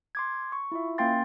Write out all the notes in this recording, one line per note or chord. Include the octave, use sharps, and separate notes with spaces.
C6 D6 G#6
C#6
E4 F4 E5
A#3 C#4 F5 G5 C6 A6